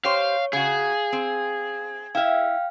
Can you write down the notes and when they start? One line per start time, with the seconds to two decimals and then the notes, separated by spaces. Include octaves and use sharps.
0.05 G4 C5 C#5 F5 C#6
0.53 C#3 F#4 G#4 F5
1.13 C4
2.15 E4 E5 F5 G5 F6